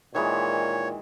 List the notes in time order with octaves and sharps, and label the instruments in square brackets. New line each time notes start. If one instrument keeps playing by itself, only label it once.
[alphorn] A#2 [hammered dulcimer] D#3 E3 G#3 [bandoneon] C#5